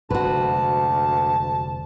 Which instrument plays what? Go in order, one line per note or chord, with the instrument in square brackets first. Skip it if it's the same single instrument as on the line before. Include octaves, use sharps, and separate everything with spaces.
[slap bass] F1 D3 G#3 [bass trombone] D2 [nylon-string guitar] F#4 B4 [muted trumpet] A5